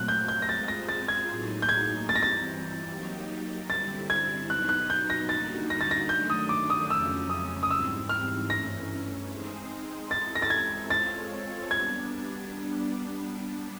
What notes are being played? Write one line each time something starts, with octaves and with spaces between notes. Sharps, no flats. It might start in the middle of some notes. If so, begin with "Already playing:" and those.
Already playing: A#2 F#3 A3 C4 F#6
G6
G6
A#6
G#3 C4 F4 G#4 C5 A6
A#6
A6
G#6
A2 F#3 A#3 D#4 G#4
G6
G#6
E3 G3 C4 A6
A#6
A6
F#3 A#3 D#4 G4
D3 G3 C4 E4 A6
G#6
B2 F#3 B3 D#4 F#6
F#6
G6
A#6
D3 G3 A#3 D#4 F#4 A6
A#6
A6
A#6
D#3 F#3 A3 D4 G6
D#6
D6
D#6
F2 C#3 F#3 A3 C#4 E6
D#6
D#6
G#2 E3 G3 C4 E6
F6
G2 E3 A3 C#4 A#6
G#3 C4 D#4 G#4 C5
G#3 C4 E4 A4 A6
A#6
A6
G#6
G#3 C4 F4 A4 C#5 A6
G3 B3 D4 G#6